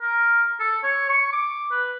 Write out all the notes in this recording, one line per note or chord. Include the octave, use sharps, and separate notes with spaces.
A#4
A4
C#5
C#6
D6
B4